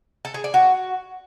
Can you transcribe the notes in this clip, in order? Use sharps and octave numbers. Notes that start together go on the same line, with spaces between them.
A4
G#4
D5
F#4